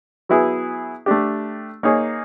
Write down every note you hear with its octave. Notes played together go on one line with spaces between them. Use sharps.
F#3 B3 E4 G#4
A3 D4 G4
A#3 D#4 G#4 C#5